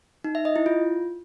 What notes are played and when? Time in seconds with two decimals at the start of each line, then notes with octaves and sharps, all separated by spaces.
0.24 D#4
0.35 E5
0.45 D#5
0.56 E4
0.66 F4